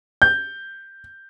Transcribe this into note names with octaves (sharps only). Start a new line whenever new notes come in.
G6